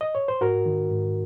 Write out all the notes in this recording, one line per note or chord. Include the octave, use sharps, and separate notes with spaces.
D#5
C#5
C5
G#2 F#4 A#4
D#3
G#2